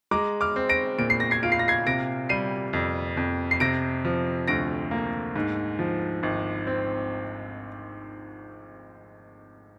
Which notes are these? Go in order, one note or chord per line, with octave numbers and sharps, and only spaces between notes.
G#3 A#5 D6
D6 F6
C4
A#6 D7
A#2 D7
C7
A#6
G#6 C7
F4 D7
C7
A#6
G#6 C7
C3 A#6 D7
G3 C7 D#7
F2
F2
C7
C3 A#6 D7
F3
D2 A#6 D7
A#3
G#2
F3
G#1
C4